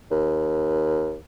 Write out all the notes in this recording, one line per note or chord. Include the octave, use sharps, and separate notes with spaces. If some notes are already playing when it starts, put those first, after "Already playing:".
D#2